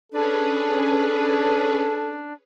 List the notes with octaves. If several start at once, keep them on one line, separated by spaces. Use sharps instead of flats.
C#4 D4 G#4 A4 B4